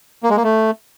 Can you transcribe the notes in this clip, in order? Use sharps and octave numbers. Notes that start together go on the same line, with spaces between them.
A#3
G#3
A#3
A3